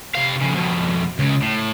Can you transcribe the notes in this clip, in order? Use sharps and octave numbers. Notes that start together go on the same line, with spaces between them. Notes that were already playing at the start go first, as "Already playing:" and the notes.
C3 F5
F2 C#3
F2 B2
C#2 C#3
A2